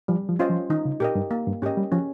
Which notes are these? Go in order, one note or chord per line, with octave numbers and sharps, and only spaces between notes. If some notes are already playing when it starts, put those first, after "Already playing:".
F3 G3
F3
C#4 F4 C5 D#5
F3
D#3 D#4
C#3
A#2 G4 A#4 D#5
G2
A#3
G2
G#2 C#4 G4 A#4 D#5
G3
F3 C#4